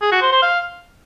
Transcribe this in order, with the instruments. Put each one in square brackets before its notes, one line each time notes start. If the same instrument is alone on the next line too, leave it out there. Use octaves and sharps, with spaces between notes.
[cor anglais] G#4
F#4
C5
C5
F5